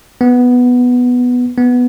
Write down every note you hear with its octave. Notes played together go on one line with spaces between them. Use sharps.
B3
B3